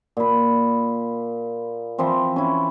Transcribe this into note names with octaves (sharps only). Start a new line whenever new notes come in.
A#2 B5
E3 F3 C4
C#4 E4